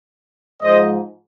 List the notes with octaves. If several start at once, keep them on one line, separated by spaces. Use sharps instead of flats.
G#2 F3 G#3 C5 D#5